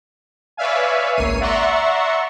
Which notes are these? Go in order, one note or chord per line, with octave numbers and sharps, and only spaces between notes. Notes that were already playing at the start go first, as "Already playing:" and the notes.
B4 C#5 D5 E5 F5 G#5
G#1 C#2 A#3 C#5 C7 D#7
D5 E5 F#5 A#5 C6 C#6